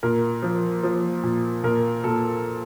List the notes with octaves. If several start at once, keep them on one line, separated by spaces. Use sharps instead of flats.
A#2 A#4
F3
F3
A#2
A#2 A#4
A#2 A4